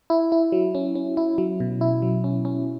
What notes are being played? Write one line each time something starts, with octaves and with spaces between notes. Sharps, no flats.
E4
E4
F#3
C#4
C#4
E4
F#3
B2
E4
F#3
C#4
C#4